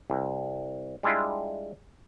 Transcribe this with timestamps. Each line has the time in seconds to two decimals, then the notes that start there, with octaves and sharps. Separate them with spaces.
0.10 C2
1.03 G3 G#3 D4 E4 F4